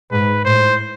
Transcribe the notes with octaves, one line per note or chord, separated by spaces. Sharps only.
G#2 B4
A2 C5